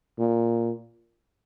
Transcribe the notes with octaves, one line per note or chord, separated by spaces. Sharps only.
A#2